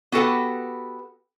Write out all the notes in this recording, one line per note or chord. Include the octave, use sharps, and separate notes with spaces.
B3 F#4 G4 A4 B4 F#5